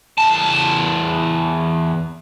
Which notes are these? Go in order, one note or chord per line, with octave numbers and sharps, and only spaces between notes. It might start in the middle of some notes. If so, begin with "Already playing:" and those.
E2 A5